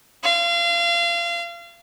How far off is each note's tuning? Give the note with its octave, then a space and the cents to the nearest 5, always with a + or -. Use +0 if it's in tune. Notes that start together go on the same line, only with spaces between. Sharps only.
F5 -30